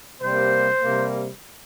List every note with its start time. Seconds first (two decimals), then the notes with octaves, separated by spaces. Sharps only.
0.21 C3 G3 A#3 C5
0.81 C3 G3 A#3